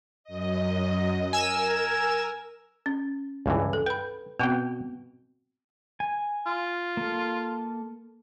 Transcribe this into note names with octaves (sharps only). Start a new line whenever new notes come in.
F#2 D#5
A#4 G#5 E6 E7
C#4
C#2 G2 E3
A4
B4 G5 B5
B2 B3 C4 F#4 G5
G#5
F4
A#3 A4